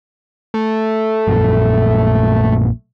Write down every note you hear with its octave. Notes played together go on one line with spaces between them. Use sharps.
A3
A#1 F#2 A#2